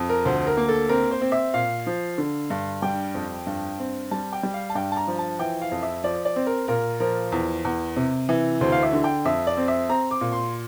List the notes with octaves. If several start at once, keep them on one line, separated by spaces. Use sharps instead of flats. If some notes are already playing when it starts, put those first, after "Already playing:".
Already playing: F2
A#4
D2 C5
A#4
A#3
A4
C4 A#4
C5
C4
E5
A#2 F5
F3
D3
G2
G3 G5
F2
G2
C4
G3 A5
G5
G3
F5
A5
G2 G5
A5
A#5
F3
A5
E3 G5
F5
F2
E5
F3 D5
D5
C4
A#4
A#2 A#4
F3 A#4
E2
E2
C3
E3
D2 C5
F5
E5
D3
G5
F2 E5
D5
C4
E5
C4 A#5
D6
A#2
C6